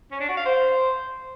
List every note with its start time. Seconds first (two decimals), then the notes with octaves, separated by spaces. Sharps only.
0.11 C#4
0.20 D4
0.28 F#4
0.37 F5
0.45 C5